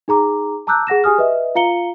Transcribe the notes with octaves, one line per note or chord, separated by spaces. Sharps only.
D#4 G#4 A#5 D6
A5 A#5 D6 E6 F#6 G6
G#4 F#5 A#6 E7
G4 G#4 G#5 D#6 F6
B4 D#5 E5
F4 F5 A#5 C#7 G7